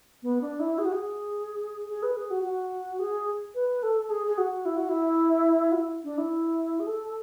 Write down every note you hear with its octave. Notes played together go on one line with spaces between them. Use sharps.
B3
D4
E4
G#4
F#4
G#4
G#4
B4
G#4
F#4
F#4
G#4
B4
A4
G#4
G#4
F#4
E4
F#4
E4
F#4
E4
D4
E4
G#4
A4